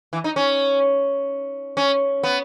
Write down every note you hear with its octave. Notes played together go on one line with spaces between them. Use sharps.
E3
D#4
C#4
C#4
B3